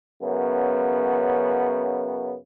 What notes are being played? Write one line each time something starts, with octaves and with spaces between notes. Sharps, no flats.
F#2 C#3 B3